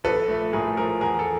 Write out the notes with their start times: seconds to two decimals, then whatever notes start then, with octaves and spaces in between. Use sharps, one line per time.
0.04 A#1 A4 B4
0.28 A3
0.53 A2 G#4 A#4
0.77 F3 G#4 A#4
1.01 E2 G#4 A#4
1.19 A4